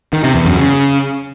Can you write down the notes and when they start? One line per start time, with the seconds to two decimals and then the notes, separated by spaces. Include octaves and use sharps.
0.13 D#3
0.24 C3
0.35 E2
0.46 F#2
0.57 C#3